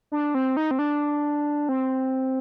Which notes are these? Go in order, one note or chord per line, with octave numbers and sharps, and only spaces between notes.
D4
C4
D#4
C4
D4
C4